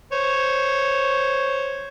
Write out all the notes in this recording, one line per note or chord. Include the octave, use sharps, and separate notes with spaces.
C5 C#5